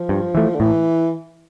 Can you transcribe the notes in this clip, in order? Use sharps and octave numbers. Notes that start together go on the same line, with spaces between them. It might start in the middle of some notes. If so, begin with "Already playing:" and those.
Already playing: F3
G2
E3 A3
D3
A2 E3